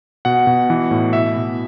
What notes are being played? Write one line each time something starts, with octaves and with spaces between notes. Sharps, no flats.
B2 F#5
B2
E3
A2
B2 E5
B2